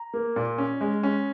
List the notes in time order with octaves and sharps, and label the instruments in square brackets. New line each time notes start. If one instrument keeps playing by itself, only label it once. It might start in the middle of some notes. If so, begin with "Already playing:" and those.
Already playing: [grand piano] A#5
A#3
A#2
C#4
G#3
C#4